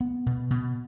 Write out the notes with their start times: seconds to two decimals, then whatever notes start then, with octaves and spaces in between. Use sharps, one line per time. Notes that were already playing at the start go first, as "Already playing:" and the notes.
0.01 B3
0.26 B2
0.50 B2